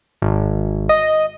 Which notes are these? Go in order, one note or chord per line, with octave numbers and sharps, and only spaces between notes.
G#1
D#5